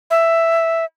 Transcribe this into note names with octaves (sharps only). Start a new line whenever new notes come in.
E5